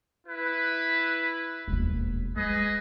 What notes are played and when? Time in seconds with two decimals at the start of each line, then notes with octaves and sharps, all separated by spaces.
0.27 E4 B4
1.68 E1 D#2
2.36 G#3 G#4 B4 D#5